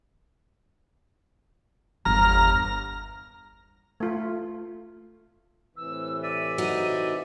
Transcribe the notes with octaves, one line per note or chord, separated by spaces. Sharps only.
G1 E2 A#5 F6
A3 F4
A2 C3 E3 E6
D5 E5 D#7
D#4 F#4